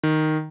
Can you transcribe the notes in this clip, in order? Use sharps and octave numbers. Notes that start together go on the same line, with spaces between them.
D#3